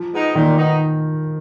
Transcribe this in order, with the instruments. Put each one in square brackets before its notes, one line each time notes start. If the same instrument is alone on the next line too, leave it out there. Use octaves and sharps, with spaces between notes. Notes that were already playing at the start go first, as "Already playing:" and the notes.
Already playing: [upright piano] F3
[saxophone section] G#3 B3 D#4
[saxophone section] A#2 [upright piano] D#3
[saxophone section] B3 D#4